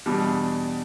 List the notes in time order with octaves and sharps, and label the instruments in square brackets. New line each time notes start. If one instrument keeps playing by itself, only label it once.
[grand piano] E2 B2 G3 D4